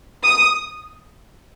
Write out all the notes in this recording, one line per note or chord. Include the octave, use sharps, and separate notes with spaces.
D#6